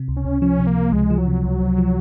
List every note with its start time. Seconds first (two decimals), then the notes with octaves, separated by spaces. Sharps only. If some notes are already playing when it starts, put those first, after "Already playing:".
Already playing: C3
0.08 C#2
0.16 C#4
0.25 C#2
0.42 F3 C#4
0.59 C3
0.67 A#3
0.76 C#2
0.92 C#2 G#3
1.10 F3
1.18 F#3
1.27 C3
1.44 C#2
1.61 C#2
1.78 F3